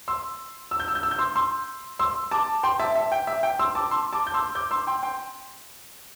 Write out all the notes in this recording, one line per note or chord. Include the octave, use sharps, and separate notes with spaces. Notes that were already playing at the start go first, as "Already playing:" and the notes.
C6 E6
E6
G6
E6
G6
E6
G6
C6 E6
C6 E6
C6 E6
A5 D6
G5 C6
E5 A5
E5
G5
E5
G5
C6 E6
A5 D6
C6 E6
A5 D6
G6
C6 E6
D6 G6
C6 E6
G5 C6
G5 C6